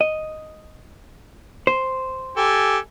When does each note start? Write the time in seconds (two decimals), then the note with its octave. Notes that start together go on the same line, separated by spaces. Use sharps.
0.01 D#5
1.67 C5
2.37 G4 A4 G#5